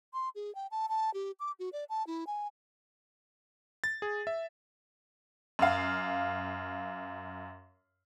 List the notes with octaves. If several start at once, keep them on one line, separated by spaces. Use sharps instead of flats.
C6
G#4
G5
A5
A5
G4
D6
F#4
D5
A5
E4
G#5
A6
G#4
E5
F#2 F5